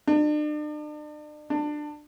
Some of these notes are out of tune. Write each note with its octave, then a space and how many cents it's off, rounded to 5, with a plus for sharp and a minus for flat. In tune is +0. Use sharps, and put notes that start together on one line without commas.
D4 +40
D4 +20